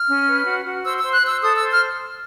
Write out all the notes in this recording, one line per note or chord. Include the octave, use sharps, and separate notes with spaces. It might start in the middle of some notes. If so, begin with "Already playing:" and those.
Already playing: F6
C#4
B4
F#4
F#4
C5 E6
C5 E6
F#6
C5 E6
A4 D#6
C5 E6
F6